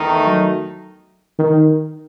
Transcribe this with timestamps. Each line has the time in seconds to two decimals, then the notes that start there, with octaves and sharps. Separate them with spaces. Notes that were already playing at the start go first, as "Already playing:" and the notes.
Already playing: E2 D#3 A3 D#4
0.26 F#3
1.39 D#3